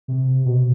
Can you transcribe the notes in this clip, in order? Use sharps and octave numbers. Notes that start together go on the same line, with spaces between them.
C3
B2